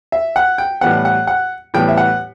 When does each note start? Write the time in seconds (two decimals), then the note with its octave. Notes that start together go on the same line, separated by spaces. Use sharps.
0.12 E5
0.36 F#5
0.58 G5
0.81 A2 E3 G3 B3 F#5
1.05 F#5
1.27 F#5
1.74 A2 E3 G3 B3 G5
1.89 E5
1.97 F#5